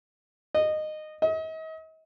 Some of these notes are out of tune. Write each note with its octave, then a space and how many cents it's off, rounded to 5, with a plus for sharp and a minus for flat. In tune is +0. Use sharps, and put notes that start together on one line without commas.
D#5 -15
D#5 +40